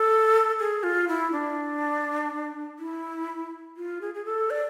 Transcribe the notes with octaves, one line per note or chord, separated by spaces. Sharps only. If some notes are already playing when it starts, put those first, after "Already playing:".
Already playing: A4
G#4
F4
E4
D4
E4
F4
G#4
G#4
A4
D5